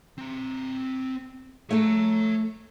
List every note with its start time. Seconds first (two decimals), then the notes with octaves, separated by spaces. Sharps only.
0.18 C4 A#5
1.71 A3 A4 C#5 A#5